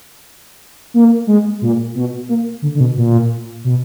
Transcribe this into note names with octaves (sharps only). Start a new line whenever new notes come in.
A#3
G#3
A#2
B2
A#3
D3
D3
B2
A#2
B2